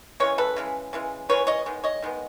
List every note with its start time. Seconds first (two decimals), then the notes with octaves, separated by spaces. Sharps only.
0.20 C#3 E3 G#3 C#5
0.38 A4 B4
0.56 C#3 E3 G#3
0.93 C#3 E3 G#3
1.29 C#3 E3 G#3 B4 C#5
1.47 C#5 D#5
1.66 D#3 G#3 B3
1.84 C#5 D#5
2.02 D#3 G#3 B3